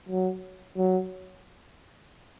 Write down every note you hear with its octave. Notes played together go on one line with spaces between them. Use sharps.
F#3
F#3